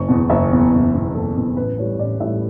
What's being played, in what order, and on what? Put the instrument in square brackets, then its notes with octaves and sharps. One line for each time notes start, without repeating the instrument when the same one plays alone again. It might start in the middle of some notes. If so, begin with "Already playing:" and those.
Already playing: [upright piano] F#1 C#6
E2 B2
F#1 E5
E2 B2
F#1
E2 B2
F#1 A4
E2 B2
A1 B4
A2 G3 C#5
A1 D5
A2 G3 E5